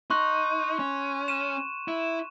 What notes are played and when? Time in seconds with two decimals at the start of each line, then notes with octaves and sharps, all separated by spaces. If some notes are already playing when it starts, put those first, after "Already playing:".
0.10 D#4 C6 C#6 F#6
0.79 C#4
1.28 D#7 E7
1.88 E4